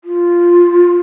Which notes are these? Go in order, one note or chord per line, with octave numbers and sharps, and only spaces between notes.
F4